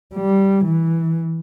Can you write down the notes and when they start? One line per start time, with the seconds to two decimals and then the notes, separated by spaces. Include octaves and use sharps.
0.15 G3
0.65 E3